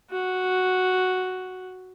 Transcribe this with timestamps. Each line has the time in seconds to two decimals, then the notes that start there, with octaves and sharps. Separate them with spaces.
0.11 F#4